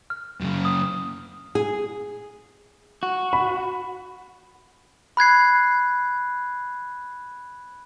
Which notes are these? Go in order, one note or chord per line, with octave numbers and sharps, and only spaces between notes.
F6
F#2 C#3
D#6
G#4
F#4
B5
B5 F#6 G#6 C7